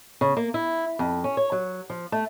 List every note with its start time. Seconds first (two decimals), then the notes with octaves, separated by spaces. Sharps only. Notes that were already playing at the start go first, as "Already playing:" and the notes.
0.21 C#3
0.37 A#3
0.54 E4
0.99 F2
1.24 C#4
1.37 C#5
1.52 F#3
1.90 F3
2.12 A3